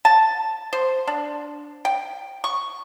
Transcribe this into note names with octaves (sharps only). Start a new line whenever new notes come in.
A5
C5
D4
G5
C#6